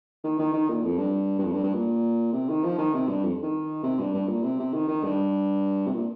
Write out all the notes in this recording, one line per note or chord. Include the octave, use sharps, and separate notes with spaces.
D#3
D#3
D#3
A#2
F2
G2
G2
F2
G2
G2
A#2
C3
D#3
F3
D#3
C3
G2
F2
D#3
C3
G2
G2
A#2
C3
C3
D#3
D#3
G2
C3
A#2